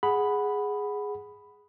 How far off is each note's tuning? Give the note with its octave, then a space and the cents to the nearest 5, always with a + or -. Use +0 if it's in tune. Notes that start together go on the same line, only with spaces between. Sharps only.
G#4 +0 F#5 +0 B5 +0